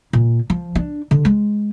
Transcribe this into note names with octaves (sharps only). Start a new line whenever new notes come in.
A#2
F3
D4
D3
G#3